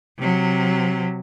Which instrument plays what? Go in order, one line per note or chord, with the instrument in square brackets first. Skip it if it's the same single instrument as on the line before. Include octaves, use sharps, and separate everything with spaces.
[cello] C3 F#3